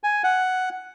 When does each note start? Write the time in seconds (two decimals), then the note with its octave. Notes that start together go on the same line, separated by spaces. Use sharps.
0.04 G#5
0.24 F#5